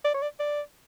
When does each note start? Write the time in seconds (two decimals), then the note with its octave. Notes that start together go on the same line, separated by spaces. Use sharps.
0.05 D5
0.14 C#5
0.22 D5
0.40 D5